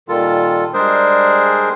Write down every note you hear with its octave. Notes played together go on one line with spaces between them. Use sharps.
A#2 D#3 G3 F4 A4
G3 G#3 D4 G#4 A#4 C5